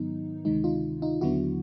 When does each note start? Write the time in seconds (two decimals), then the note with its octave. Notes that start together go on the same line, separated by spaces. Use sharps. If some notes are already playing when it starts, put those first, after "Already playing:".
Already playing: G#2 D#3 F#3 B3 D#4
0.45 D2 C3 D#3 G#3 D#4
0.64 D#4 F4
1.02 D#4 F4
1.21 D#2 D3 F#3 B3 D4 E4 F#4